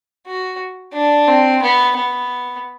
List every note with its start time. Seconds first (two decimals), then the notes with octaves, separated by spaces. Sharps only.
0.27 F#4
0.94 D4
1.28 C4
1.62 B3
1.96 B3